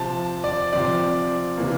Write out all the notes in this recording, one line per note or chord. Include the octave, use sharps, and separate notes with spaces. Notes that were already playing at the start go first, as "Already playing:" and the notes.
Already playing: C3 F3 C4 A5
D5
C3 F3 C4 D5
C3 E3 A#3